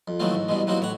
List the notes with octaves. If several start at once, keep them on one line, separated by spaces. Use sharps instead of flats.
F2
D#3 E3 F#3 A3 A#3 C4
G#2
G2 B2 E3 G#3
E3 F#3 A#3 C4 D#4 F#4
A2 C#5 F#5